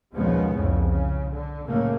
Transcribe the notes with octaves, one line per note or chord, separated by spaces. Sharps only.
A#1 D#2 C#3 F3 G#3 B3
C2 F2 A2 C#3
C#3
D3
F#2 A2 C#3 A3 A#3